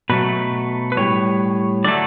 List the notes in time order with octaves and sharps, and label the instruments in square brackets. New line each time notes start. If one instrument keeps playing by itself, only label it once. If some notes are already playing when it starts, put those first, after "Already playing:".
[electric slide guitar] B2 F#3 A3 B4
B4
A2 G3 C#5
D3 F#3 A3 D5